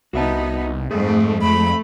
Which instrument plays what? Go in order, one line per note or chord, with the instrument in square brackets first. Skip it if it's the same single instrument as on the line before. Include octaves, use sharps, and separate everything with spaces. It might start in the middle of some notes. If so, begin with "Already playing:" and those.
[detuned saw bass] C2 [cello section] B3 D#4 [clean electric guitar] F#4 E5 A5
[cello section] F2 G#2 [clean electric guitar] G#3 G#4 [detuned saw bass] A3
[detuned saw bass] F2 [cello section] A3 [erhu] B5